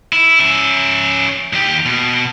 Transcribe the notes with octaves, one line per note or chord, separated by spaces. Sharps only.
E4
C#4 E5
D#2 G4
B2